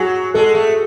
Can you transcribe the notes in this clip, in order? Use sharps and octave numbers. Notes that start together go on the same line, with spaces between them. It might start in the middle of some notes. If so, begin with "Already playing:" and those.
Already playing: F#3 F#4 G#4
G#3 A4
A3